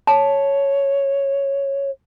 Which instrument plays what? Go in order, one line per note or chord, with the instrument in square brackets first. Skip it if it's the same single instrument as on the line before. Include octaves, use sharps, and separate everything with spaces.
[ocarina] C#5 [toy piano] A5